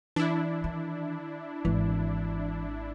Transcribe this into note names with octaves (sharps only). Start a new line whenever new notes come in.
E3 D4 E4
D#3
G#1 E3